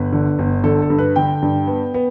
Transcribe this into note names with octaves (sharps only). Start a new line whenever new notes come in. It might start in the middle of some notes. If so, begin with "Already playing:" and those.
Already playing: G1 B4
D3
G1
D3 A4
A4
G2
B4
D3 G5
G2
B3
B3